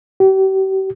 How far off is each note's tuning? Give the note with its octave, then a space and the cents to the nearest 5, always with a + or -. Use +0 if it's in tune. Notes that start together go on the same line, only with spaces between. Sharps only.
G4 -40